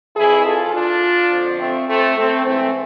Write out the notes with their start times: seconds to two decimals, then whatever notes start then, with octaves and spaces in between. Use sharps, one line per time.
0.16 F2 E3 E4 G#4
0.45 F4 A4
0.72 D4 F4
1.30 F2 D3 F3
1.59 A3 C4
1.87 A3 C4
2.16 A3 C4
2.45 G#2 E3 A3 C4